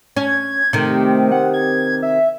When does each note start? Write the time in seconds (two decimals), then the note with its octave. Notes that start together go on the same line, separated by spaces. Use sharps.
0.16 C#4 G#6
0.73 C3 D#3 A3
1.32 F#5
1.54 G#6
2.02 E5